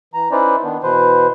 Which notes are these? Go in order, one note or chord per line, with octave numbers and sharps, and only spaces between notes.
E3 A#5
C#4 D#4 E4 B4 C5 D5
D#3 B3 D4
B2 E3 B4 C5